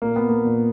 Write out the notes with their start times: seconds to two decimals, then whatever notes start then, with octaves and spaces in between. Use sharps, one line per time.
0.02 A#2 A#3
0.16 B3
0.29 A#3
0.45 A#2